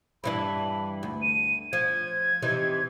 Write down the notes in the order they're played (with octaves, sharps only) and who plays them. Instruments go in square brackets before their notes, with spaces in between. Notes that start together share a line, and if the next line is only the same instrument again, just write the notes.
[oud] G2 E3 D4 [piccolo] B5
[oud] D2
[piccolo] D#7
[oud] F3 [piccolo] G#6
[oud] C3 E3 D#4